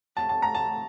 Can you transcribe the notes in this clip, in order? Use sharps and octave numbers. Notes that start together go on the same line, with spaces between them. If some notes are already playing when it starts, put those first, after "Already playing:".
A5
A5
A#5
A5